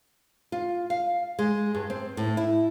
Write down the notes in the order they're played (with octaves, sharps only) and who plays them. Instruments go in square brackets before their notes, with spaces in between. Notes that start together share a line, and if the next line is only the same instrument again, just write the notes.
[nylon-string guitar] F4
F5
G#3
G2
C4
A2
E4